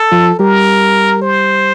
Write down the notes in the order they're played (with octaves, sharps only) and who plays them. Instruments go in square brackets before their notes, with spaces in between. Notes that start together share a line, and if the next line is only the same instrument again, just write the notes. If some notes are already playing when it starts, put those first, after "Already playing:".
Already playing: [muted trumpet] A4
[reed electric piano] F3 F4
[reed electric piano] G3 G4 [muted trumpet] A#4
[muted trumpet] C5